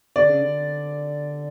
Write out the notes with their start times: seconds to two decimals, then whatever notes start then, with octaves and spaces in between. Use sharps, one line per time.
0.16 D3 D5
0.28 C#3
0.41 D3